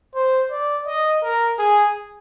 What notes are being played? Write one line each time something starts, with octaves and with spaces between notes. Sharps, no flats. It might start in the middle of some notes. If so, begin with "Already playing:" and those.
C5
D5
D#5
A#4
G#4